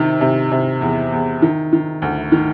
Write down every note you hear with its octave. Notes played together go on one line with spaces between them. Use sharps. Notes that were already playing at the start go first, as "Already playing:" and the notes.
Already playing: C3 D#3
C3
C3
E2
E2
D#3
D#3
D2
D#3